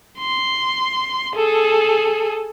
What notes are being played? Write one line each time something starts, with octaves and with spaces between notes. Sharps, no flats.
C6
G#4 A4